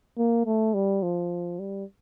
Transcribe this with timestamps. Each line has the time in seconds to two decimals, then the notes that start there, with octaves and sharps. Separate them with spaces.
0.18 A#3
0.46 A3
0.74 G3
1.03 F3
1.59 G3